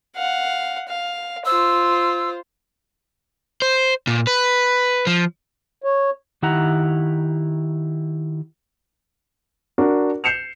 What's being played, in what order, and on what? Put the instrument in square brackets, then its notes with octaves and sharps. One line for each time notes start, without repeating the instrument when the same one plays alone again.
[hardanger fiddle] F5 F#5
F5
[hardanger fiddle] F4 C5 [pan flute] E6
[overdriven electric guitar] C5
A#2
B4
F3
[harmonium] C#5
[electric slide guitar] D#3 E4 G4 F#5 A#5
[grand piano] D4 F#4 A#4
G6 C7 C#7 E7 F7